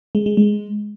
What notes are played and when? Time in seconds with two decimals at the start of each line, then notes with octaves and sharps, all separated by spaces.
0.15 G#3
0.26 G#3
0.37 G#3